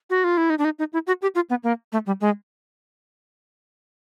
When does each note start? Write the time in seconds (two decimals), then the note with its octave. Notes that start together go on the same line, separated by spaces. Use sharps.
0.10 F#4
0.24 F4
0.37 E4
0.50 D#4
0.58 D4
0.65 D#4
0.79 D#4
0.93 E4
1.07 F#4
1.22 G4
1.35 F4
1.50 B3
1.64 A#3
1.93 A3
2.06 G3
2.21 G#3